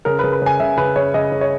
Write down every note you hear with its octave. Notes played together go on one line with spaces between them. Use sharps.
C#3 A#4
B4
C#3
B4
C#3 G#5
C#3 E5
C#3 B4
C#3 C#5
C#3 D#5
C#3
C#5